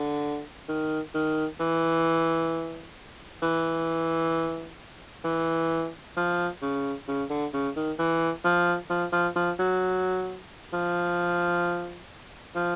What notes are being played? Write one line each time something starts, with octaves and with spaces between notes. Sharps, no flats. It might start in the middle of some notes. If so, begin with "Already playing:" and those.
Already playing: D3
D#3
D#3
E3
E3
E3
F3
C#3
C#3
D3
C#3
D#3
E3
F3
F3
F3
F3
F#3
F3
F3